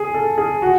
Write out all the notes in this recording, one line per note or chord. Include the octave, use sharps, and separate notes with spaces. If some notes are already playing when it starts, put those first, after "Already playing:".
Already playing: G#4
A4
G#4
F#4